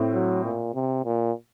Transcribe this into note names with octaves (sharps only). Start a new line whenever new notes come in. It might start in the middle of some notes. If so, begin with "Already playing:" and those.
Already playing: A2 A3 C4
F#3
A#2
C3
A#2